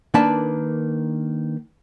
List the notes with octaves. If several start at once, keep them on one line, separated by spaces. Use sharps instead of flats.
D#3 A#3 D4 B4 D5 A5